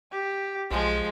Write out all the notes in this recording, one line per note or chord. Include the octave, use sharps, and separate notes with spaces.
G4
B1 F3 G#3